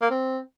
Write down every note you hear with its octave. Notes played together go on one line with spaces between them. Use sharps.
A#3
C4